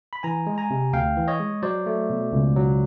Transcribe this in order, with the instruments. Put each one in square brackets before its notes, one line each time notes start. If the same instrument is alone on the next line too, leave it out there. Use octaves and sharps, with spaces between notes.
[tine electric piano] B5
E3 G#5 A#5
G#3
G#5 A#5
C3
D2 F5 G5
E3
C#5 D#5
G#3
F#3 C5 D5
A3
B2
C#2
F#3